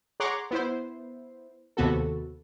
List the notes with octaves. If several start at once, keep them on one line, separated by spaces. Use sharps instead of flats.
G#4 C#5 F#5 A#5 C6 D6
B3 E4 C5
D#2 C3 B3 F#4 A4